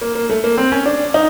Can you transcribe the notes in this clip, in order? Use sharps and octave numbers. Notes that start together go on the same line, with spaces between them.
A#3
A#3
A3
A#3
C4
C#4
D4
D#4